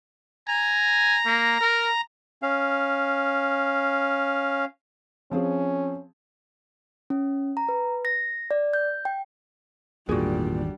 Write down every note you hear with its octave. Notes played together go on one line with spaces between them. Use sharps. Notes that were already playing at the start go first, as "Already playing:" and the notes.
G#5 A#5
A#3
A#4
C#4 F5
F3 C4 C#4 G#4
C#4
A#5
B4
A#6
D5
G6
G5
G#1 E2 A#2 D#3 G3 D4 F#4 G#4